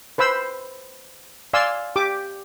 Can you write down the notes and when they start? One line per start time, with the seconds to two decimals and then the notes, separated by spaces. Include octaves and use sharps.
0.18 B4 C5 B5 E6
1.53 D5 F5 G#5 C6 E6
1.96 G4 D6